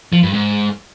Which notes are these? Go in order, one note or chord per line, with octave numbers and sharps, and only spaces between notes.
F3
G2
G#2